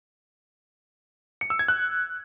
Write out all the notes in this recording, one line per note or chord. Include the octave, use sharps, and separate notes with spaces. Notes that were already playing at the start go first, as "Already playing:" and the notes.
C#7
E6
G#6
F#6